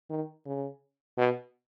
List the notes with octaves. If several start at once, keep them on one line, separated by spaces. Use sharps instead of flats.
D#3
C#3
B2